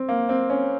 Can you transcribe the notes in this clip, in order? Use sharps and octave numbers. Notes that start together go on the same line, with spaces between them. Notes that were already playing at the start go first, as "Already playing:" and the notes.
Already playing: C4
A#3
C4
C#4